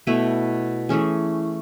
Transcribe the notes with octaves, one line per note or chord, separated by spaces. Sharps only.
B2 A3 E4 B4
E3 A3 C#4 G#4